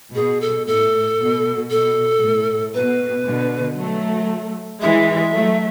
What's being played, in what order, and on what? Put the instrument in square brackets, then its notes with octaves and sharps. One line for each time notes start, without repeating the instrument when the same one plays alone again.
[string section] B2 [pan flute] G#4
[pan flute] A4
[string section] A2 [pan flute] A4
[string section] B2
[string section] B2 [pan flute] A4
[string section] A2
[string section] B2 [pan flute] B4
[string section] B2 D3
F#3 A3
[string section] E3 G#3 [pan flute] E5
[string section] F#3 A3